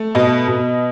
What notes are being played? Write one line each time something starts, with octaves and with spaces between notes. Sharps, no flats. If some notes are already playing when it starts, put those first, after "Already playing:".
Already playing: A3
B2 D#5
B2